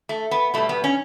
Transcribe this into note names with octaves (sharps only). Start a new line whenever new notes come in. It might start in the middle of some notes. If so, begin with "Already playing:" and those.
A3
B3
B2 G3 A3
B3
C#4